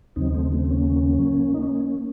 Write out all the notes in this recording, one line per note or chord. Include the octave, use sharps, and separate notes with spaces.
D#2 C#3 F#3 C4 D#4
A3 C4
A3 C4
C4
A#3 C#4
D#4
A#3 C#4